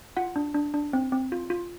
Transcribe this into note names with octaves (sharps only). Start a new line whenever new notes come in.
F4 F#5
D4
D4
D4
C4
C4
F4
F4